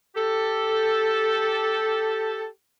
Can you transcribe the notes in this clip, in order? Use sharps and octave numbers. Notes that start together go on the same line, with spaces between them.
G4 A4